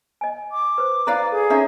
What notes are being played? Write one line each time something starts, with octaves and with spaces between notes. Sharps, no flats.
D#5 G#5
D6
B4 C5
E4 B4 D5 F5 A#5
G#4 A4
C#4 D#4 C#5 E5 A#5